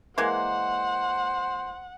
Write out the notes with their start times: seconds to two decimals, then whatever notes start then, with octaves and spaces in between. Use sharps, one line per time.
0.18 E3 G#3 A#3 C5 F#5